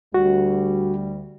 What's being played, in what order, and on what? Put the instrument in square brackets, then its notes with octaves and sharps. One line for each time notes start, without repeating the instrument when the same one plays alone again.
[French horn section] D2 G3 [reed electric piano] F#4